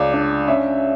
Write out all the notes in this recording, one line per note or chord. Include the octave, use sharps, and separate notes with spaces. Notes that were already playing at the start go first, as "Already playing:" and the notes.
Already playing: C#2 D5
D4
C#4 E5